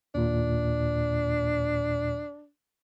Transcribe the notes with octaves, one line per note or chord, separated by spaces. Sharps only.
D#2 A#2 D4